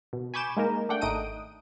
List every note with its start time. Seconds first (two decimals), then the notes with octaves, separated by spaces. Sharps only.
0.13 B2
0.34 G#5 B5 C#6 D6 G6 E7
0.57 G#3 A#3 D#4 A#4
0.89 A3 D4 F#5 G5
1.01 G#1 A3 D#4 D#6 D7 D#7